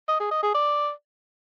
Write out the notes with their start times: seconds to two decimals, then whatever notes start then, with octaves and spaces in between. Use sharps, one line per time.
0.09 D#5
0.20 G#4
0.32 D#5
0.43 G#4
0.55 D5